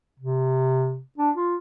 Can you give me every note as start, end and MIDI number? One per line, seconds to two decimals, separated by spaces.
0.20 1.00 48
1.18 1.30 62
1.36 1.55 65